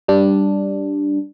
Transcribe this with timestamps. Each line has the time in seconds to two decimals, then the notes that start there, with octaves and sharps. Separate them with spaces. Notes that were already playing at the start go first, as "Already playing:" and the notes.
0.08 G3 D4